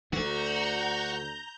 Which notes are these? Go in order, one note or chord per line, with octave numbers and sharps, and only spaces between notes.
D2 D3 F#4 A#5 G6